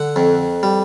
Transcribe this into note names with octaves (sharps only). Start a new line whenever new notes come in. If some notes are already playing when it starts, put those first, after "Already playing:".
Already playing: D3 F#5
F2
G3